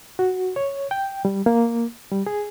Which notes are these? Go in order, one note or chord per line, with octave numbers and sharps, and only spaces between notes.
F#4
C#5
G5
G3
A#3
G3
G#4